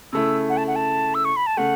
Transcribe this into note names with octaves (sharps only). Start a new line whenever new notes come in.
C#3 A3 E4 E6
F#5
A5
F#5
A5
E6
C#6
B5
A5
C#3 A3 F#5